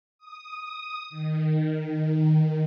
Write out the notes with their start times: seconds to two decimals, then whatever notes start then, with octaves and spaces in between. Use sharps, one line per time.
0.18 D#6
1.10 D#3